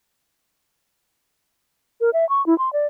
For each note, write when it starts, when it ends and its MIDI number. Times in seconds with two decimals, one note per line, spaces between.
2.01 2.10 70
2.14 2.27 76
2.29 2.45 85
2.46 2.57 64
2.58 2.72 84
2.73 2.87 74